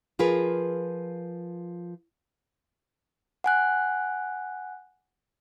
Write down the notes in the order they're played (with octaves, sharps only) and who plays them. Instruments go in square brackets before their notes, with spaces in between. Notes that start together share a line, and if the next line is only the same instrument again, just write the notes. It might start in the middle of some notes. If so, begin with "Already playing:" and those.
[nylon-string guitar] F3 F4 G#4 A#4 B4
[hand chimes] F#5 G#5 F#6